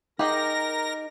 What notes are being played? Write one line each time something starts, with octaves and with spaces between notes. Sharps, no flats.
D#4 G4 G#4 A#4 G5 A#6